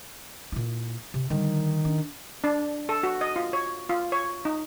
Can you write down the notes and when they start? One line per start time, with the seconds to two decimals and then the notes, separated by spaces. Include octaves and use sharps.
0.52 A#2 E4
1.14 C3
1.30 D3 D#3 G3
1.85 D4
2.44 D4
2.89 A4
3.03 F#4
3.21 D#5
3.36 F4
3.53 C#5
3.89 F4
4.12 C#5
4.45 D#4